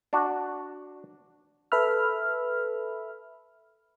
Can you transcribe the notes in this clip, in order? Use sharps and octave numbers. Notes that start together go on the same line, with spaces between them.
D4 F#4
A4 B4 E5 B5 F6